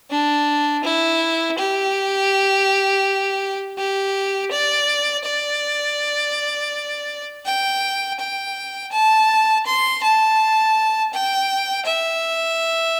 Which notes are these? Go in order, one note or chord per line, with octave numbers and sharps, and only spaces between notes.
D4
E4
G4
G4
D5
D5
G5
G5
A5
C6
A5
G5
E5